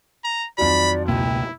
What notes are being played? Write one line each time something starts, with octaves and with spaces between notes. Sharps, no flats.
A#5
F2 D#3 F#3 D5 B5
C#2 B2 A#3 E4 G5